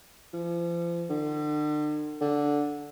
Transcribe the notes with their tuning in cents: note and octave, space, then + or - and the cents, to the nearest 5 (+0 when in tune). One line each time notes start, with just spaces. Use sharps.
F3 -35
D3 +40
D3 -5